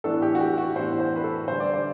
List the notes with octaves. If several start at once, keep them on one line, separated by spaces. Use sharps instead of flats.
A2 E3 B3 D4 A4
G4
F#4
G4
F#4
A2 E3 B3 D4 C5
C5
B4
A4
D3 G3 D4 C5
D5
C5